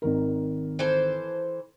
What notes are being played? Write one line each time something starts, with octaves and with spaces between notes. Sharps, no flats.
G#1 D#3 A#4
E3 A4 C5